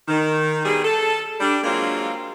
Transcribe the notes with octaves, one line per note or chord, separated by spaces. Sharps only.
D#3
B2 G3 D#4 G#4
A4
G3 D4
F#3 G#3 A#3 C4 D4 F4